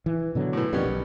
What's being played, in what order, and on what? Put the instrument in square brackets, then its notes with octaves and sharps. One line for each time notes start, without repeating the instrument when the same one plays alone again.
[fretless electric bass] E3
B2 D3 F#3
[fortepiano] A2 E3
[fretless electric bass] F2 D#3 [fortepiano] G3 B3 C#4
[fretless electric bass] B1